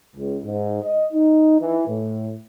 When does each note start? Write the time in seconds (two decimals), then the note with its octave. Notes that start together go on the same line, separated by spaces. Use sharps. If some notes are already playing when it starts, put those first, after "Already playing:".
0.16 C#2
0.45 G#2
0.83 D#5
1.13 D#4
1.60 E3
1.88 A2